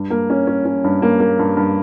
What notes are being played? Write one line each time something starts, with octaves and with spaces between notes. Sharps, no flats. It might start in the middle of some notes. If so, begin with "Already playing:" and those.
Already playing: G2
A#3
C#4
C#4
C#4
G2
A#3
A#3
G2
G2